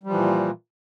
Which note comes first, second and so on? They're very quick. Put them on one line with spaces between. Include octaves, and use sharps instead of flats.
G3 F3 E3 A#2